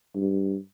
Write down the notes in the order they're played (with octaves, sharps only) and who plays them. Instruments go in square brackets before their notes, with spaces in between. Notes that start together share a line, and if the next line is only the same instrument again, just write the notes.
[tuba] G2